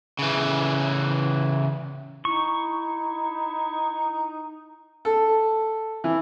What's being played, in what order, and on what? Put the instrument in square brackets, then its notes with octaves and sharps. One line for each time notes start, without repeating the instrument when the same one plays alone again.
[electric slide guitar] C#3 E3
[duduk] D#4 [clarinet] E4 [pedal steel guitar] C#6
[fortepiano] A4
E3